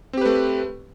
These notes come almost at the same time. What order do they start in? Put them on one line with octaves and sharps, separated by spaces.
C4 G4 B4 A3